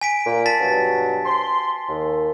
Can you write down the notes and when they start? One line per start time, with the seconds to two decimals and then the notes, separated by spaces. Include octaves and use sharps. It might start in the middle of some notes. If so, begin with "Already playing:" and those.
0.01 G#5 B6 D7
0.26 A#2
0.46 A5 A6 B6
0.59 G2 B2 F#3
1.26 C6
1.89 D#2